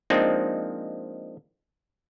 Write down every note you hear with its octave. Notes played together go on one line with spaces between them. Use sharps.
F3 G#3 A#3 C4 D4 D#4